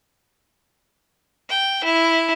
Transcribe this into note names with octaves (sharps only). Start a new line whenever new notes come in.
G5
E4